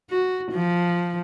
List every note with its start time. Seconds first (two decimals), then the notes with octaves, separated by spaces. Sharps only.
0.10 F#4
0.52 F3